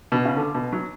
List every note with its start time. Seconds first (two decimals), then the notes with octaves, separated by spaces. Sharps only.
0.12 B2
0.25 C#3
0.37 D3
0.55 B2
0.73 F#3